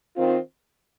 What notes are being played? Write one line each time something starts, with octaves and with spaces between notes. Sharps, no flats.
D#3 C4 F4